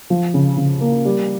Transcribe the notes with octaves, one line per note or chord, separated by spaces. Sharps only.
F3
C#3
C#3
A#3
G3